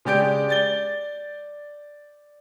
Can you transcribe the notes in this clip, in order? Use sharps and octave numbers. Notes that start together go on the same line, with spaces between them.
C#3 G#3 G4 D5 G6 D7
D5 A6 G7